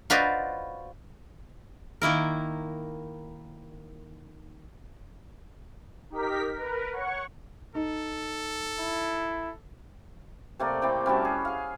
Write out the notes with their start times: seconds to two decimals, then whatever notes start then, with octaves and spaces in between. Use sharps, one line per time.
0.10 F4 F#4 B4 C5 D5 D#5
2.02 D#3 A#3 E4 A#4
6.10 D#4 G4 A#4 B6
6.54 A#4 B4
6.93 C#5 F#5 C#6
7.75 D#4 A4
8.79 E4
10.59 C3 A3 A#3 D5
10.82 C4 E4 D5 G5
11.06 G3 C#4 F#4 A5
11.25 G#4
11.45 G#4 F5